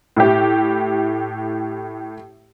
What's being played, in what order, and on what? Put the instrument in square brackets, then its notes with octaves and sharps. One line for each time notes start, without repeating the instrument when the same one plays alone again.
[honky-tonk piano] A2 E4 G4